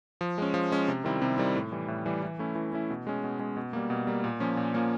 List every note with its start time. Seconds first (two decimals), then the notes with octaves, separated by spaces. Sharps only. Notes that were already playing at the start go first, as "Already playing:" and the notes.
0.21 F3
0.38 G#3 C#4
0.54 F3
0.72 G#3 C#4
0.88 C3
1.04 D#3 G3 C4 E4
1.22 C3
1.38 D#3 G3 C4 E4
1.55 A2
1.72 E3 G3
1.88 A2
2.06 E3 G3
2.23 E3
2.39 A3 C#4 E4
2.55 E3
2.72 A3 C#4 E4
2.90 B2
3.07 G#3 C#4
3.24 B2
3.39 G#3 C#4
3.57 B2
3.73 G3 A#3
3.90 B2
4.07 G3 A#3
4.24 A#2
4.40 F3 A#3 C#4
4.57 A#2
4.74 F3 A#3 C#4